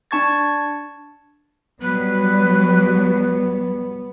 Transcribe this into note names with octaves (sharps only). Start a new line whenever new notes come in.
D4 A5 C#6 G#6 A6
F#3 G3 B3 B4